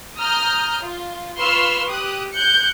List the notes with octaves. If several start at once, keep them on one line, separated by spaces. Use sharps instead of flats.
A#5 D#6 F6 G6
F4
F4 B4 C6 C#6 E6 F6
G4 D#6 F#6
F#6 G6 C#7